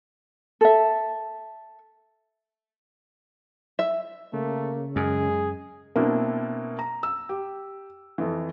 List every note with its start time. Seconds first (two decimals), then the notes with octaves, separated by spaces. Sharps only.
0.61 A4 E5
3.79 E5
4.33 C#3 A3 A#3
4.96 F#2 G#3 G#4
5.96 B2 A#3 C4 D4 E4
6.79 A#5
7.03 E6
7.29 G4
8.18 F2 E3